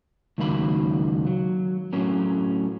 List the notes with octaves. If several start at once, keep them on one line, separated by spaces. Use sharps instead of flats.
C#2 D#3 F#3 A#3 F5 B5
F#3
A2 F#3 C#4 A#4